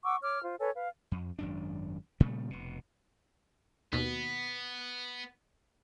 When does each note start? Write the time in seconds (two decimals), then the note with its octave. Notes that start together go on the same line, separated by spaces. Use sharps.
0.04 F#5 C#6 D6 E6
0.22 C#5 D6 F6
0.43 F4 C5
0.59 A4 B4 C#5 G#5
0.75 B4 F5
1.12 F2
1.39 G#1 F#2 D4
2.20 A#2 C#3 G3 A3
2.50 F1 B2
3.93 D#2 B2 B3